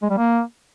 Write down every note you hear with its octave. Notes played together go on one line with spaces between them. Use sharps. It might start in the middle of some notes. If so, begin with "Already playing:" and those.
G#3
G3
A#3